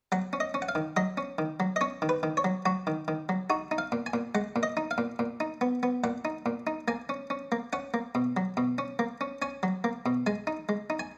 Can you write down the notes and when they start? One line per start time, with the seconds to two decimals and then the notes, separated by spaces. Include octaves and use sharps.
0.12 F#3 F#5
0.33 C#4
0.40 D#5
0.54 C#4
0.62 F#5
0.69 F5
0.75 D#3
0.97 F#3 D#5
1.17 C#4
1.38 D#3
1.60 F#3
1.76 D#5
1.81 C#4 C#5
2.02 D#3
2.09 B4
2.23 D#3
2.37 C#5
2.44 F#3
2.66 F#3 F#4
2.87 D#3
3.08 D#3
3.29 F#3
3.50 D#4 F#4
3.71 D#4
3.78 F5
3.92 A#2
4.06 G#5
4.13 A#2
4.35 G#3 F#5
4.56 A#2
4.63 D#5
4.77 D#4
4.91 F5
4.98 A#2
5.19 A#2
5.40 D#4
5.61 B3
5.83 B3
6.04 A#2 F#5
6.25 D#4
6.46 A#2
6.67 D#4
6.88 A#3 G#5
7.09 C#4
7.30 C#4
7.52 A#3
7.73 C#4 F#5
7.94 A#3
8.15 B2
8.37 F#3
8.57 B2
8.78 C#4
8.99 A#3
9.21 C#4
9.42 C#4 G#5
9.63 F#3
9.84 A#3
10.06 B2
10.26 G#3 G#5
10.47 D#4
10.69 G#3
10.90 D#4
10.99 G#5